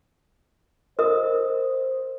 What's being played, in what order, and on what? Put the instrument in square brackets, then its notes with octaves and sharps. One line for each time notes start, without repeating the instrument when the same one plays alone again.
[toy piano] A#4 D#5 D#6 [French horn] C5